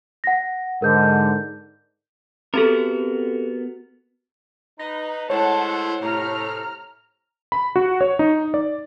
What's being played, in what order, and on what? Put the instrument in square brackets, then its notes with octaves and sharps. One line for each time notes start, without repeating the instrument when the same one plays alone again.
[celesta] F#5 A#6
[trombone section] G#2 D3 [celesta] A#4 G6
[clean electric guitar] B3 F#4 A#4 [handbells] C4 G4 A4
[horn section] D#4 B4 [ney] A#5 [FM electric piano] A#6
[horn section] G#3 A3 C5 [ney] E4 [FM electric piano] C#5 [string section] F#5 A5
[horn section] A2 C3 A3 [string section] A#5 F6
[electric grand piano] B5
F#4
C#5
D#4
D5